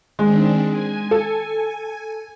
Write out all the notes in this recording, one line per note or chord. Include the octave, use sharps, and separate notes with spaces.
D#3 G#3 C4 D4
G#5
A4